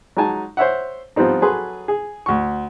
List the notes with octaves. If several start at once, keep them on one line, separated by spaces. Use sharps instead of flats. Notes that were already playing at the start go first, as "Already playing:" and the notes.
F#3 G#3 D#4 G#5 A5
C5 C#5 E5 F#5
F3 G3 B3 C4 D#4
F#3 G#4 A4 B4 C6
G#4
D2 C#6